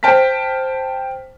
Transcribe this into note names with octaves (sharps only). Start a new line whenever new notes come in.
C5 G5 A5 F6 B6